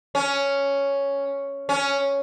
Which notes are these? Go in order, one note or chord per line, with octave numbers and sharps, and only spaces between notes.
C#4
C#4